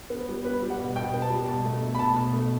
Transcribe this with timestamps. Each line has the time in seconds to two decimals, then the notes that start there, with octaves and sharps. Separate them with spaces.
0.10 B3
0.28 G3
0.44 B3 B4
0.63 G3
0.70 F#5
0.79 B2
0.96 B2 G5
1.14 B3
1.22 A5
1.30 G3
1.48 B2 A5
1.65 A3
1.82 A3
1.95 B5
1.99 B2 A5
2.16 B2
2.33 A3